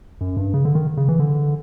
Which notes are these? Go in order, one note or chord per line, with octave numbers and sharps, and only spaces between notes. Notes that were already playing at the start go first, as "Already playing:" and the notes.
F#2
G2
C#3
D3
D#3
C#3
E3
D3